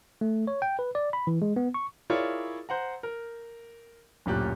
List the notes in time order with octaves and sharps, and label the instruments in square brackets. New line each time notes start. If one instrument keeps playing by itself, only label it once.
[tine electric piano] A3
C#5
G5
B4
D5
B5
E3
G#3
B3
C#6
[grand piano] E4 F4 G#4 A#4 C#5 D5
C5 F#5 A#5
A#4
D1 F#2 A#2 G4 F#6